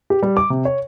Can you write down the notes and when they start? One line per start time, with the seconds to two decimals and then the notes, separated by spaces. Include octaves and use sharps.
0.10 G4
0.22 G3
0.37 D6
0.50 C3
0.65 C#5